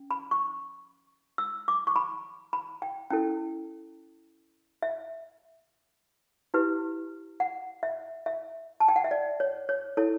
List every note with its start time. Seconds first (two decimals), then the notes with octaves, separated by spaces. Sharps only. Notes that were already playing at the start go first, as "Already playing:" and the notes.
Already playing: C#4
0.11 B5
0.31 C#6
1.38 E6
1.68 D6
1.87 C#6
1.96 B5
2.53 B5
2.82 G5
3.10 C#4 E4 A4 G5
4.82 E5
6.54 E4 G4 B4
7.40 F#5
7.83 E5
8.26 E5
8.80 A5
8.88 G5
8.96 F#5
9.04 E5
9.11 D5
9.40 C#5
9.69 C#5
9.97 E4 A4 C#5